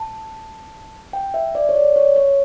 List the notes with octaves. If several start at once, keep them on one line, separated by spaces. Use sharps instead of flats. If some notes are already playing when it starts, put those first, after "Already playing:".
Already playing: A5
G5
E5
D5
C#5
D5
C#5
C#5